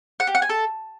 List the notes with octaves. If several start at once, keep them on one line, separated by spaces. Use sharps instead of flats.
F#5
G4
F#5
G#5
A4